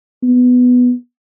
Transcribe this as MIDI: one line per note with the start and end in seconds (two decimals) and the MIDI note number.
0.23 0.92 59